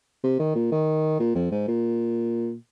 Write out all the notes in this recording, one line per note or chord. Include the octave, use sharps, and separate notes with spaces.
C3
D#3
A#2
D#3
A#2
F2
G#2
A#2